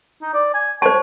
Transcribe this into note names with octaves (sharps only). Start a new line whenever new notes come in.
D#4
D5
G#5
C5 C#5 A5